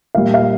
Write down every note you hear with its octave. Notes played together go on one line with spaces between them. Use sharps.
A#2 G3 F5
F5